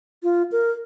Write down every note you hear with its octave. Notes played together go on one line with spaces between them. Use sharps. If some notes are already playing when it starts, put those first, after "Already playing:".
F4
A#4